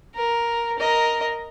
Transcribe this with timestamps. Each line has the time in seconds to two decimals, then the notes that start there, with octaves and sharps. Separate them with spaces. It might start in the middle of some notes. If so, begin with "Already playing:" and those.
0.15 A#4
0.78 A#4 D#5